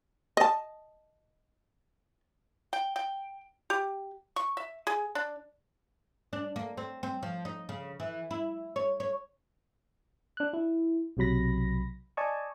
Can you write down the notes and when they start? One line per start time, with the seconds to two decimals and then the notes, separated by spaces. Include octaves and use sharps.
0.37 D#5 A5
2.73 G5
2.96 G5
3.70 G4
4.36 C#6
4.57 E5
4.87 G#4
5.15 D4
6.33 D4
6.56 A#3
6.77 C4
7.03 C4
7.23 F3
7.45 D#4
7.69 C#3
8.00 E3
8.31 E4
8.76 C#5
9.00 C#5
10.37 D4 F#6
10.53 E4
11.17 B1 C3 F#3 B5 A#6
12.17 D5 D#5 G#5 A5 C#6